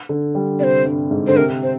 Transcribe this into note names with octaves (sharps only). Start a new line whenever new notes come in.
D3
G3
C3 D5
C5
G2
G#2
D3 C5
C3 A#4
C5